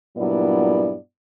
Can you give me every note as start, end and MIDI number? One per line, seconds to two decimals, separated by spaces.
0.17 0.94 43
0.17 0.94 46
0.17 0.94 54
0.17 0.94 59
0.17 0.94 64
0.17 0.94 74